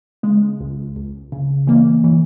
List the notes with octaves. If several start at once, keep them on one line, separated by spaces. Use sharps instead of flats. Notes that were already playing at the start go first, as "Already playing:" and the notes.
C#3 G#3
C#2
C#2
C#3
E3 A#3
E3